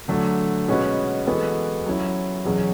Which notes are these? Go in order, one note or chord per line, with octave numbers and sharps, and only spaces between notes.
D3 F#3 A3 D4
B2 G#3 C#4 F#4 B4
E3 G#3 B3 F#4 A4
F#3 C#4 E4
E2 B2 F#3 C#4 G#4